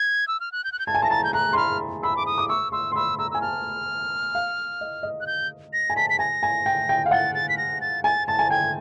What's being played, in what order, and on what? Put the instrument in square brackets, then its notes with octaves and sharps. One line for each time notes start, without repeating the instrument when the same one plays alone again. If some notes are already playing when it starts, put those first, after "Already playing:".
Already playing: [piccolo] G#6
E6
F6
F#6
G6
F#6
G6
[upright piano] A5 [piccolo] G#6
[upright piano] G#5
[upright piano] A5 [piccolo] A#6
[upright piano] A#5 [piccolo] A6
[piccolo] G6
[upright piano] A#5 [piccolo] F#6
[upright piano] C6
[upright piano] B5 [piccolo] F6
[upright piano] B5 [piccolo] E6
[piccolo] D6
D#6
[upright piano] D6
[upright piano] C#6 [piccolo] E6
[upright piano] C6 [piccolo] E6
[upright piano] C6
[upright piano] B5 [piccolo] E6
[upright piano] A#5 [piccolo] E6
[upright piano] G#5 [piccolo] E6
[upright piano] A5 [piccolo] F6
[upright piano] F5
D#5
D#5
[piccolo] F#6
G6
A#6
[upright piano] G#5
[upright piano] A5 [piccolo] B6
[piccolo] B6
[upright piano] G#5 [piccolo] A#6
[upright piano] G#5
G5
G5
F5
[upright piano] F#5 [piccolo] A6
[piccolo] A6
B6
A#6
A6
[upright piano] G#5 [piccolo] A6
[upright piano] A5 [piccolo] A6
[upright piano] G#5
[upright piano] G5 [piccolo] G#6